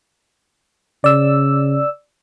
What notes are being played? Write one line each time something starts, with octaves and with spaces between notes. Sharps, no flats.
C#3 D5 E6